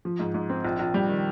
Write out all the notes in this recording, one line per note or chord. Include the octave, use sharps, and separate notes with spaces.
F3
G#2
G#2
C4
A#1
A#1
G3
D#3